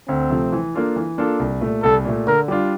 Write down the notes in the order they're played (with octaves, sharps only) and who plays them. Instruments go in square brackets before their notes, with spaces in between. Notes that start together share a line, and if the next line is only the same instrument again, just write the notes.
[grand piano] D2 [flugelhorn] C4
[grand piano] C3 F3 A3
E3
A#3 D4 F4 A4
E3
A#3 D4 F4 A4
C2
A#2 A3
[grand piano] C2 [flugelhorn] A4
[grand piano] A#2 A3
[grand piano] D3 [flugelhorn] A#4
[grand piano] G3 D4 F4